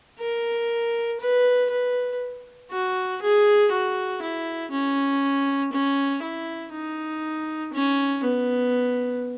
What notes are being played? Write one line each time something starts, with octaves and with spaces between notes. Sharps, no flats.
A#4
B4
B4
F#4
G#4
F#4
E4
C#4
C#4
E4
D#4
C#4
B3